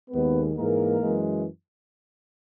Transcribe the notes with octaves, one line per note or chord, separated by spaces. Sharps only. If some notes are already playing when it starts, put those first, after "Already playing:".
D#2 D#3 G#3 B3 B4
G#2 E3 G#3 A#3 A#4
F#2 E3 G#3